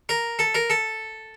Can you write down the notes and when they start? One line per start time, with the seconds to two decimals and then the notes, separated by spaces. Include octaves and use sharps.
0.09 A#4
0.39 A4
0.55 A#4
0.70 A4